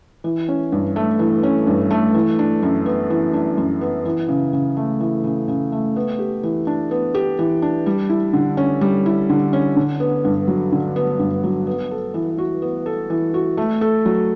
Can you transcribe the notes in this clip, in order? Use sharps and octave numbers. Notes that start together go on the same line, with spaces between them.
E3
C#4
G2
A3
E3
C#4
G2
A3
E3
D4
F#2
B3
E3
D4
F#2
B3
E3
C#3
C#3
A3
E3
C#3
C#3
A3
B3
G4
E3
D4
B3
G4
E3
D4
G3
E4
D3
C#4
G3
E4
D3
C#4
D3
B3
G2
F#3
D3
B3
G2
F#3
B3
A4
E3
F#4
B3
A4
E3
F#4
A3
A4
F#3